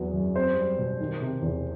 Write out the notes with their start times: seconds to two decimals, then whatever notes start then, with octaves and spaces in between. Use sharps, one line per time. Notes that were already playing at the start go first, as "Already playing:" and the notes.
Already playing: E2 F#3 B3
0.14 F#2
0.35 C4 C5
0.56 G3
0.78 B2
1.00 D#3
1.21 C3
1.42 E2